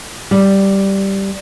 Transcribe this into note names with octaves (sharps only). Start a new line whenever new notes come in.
G3